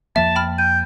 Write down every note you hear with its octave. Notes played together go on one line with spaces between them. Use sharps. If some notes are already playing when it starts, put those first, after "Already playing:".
F2 F3 A#3 E5 A5
G5 B5 F6
G5 D#7